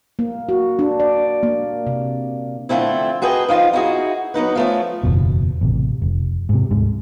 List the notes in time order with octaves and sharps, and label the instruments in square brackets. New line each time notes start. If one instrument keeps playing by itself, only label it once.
[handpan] A#3
F#4
D4
D5
A#3
C3
[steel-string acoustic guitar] D3 F3 A3 C4 E4
F#4 G#4 A4 B4 D#5 G5
F3 D#4 F4 F5
D#4 E4 F#4 G#4
F#3 B3 D#4 B4
F3 A3 C#4
[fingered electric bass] F#1 E2 B2
A1 C3
F1
G#2 C3
D2 G#2 D3